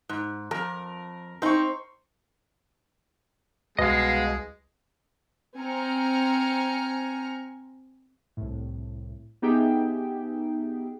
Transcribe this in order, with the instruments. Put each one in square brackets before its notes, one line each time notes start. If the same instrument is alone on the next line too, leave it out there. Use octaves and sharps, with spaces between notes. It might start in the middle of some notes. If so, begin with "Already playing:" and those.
[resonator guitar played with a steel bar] G#2
[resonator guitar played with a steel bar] F2 [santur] A#4
[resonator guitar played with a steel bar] C4 D#4 [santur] C5 C#6
[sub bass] C2 [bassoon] B2 [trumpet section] G#3 [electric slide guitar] D#5 F5
[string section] C4 G#5 A#5 F6 C#7
[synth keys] C2 A2
B3 D#4 G4 G#4 E5 G5